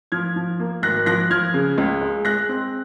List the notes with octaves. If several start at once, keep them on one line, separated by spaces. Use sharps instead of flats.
F3 F6 G#6
F3
A#3
G#1 F#6 A#6
F3 F#6 A#6
F3 F6 G#6
C#3
C#2
G#3
G#3 F#6 A#6
C4